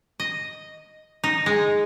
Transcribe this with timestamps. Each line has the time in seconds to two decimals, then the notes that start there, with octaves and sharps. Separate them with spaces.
0.20 D#5
1.24 D#4
1.46 G#3